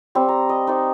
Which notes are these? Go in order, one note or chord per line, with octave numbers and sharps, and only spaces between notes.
G3 C4
A#5
D#5
D#4 C5 D5